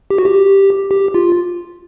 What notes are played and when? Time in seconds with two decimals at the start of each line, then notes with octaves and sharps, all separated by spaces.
0.10 G4
0.19 F#4
0.25 G4
0.91 G4
1.14 F4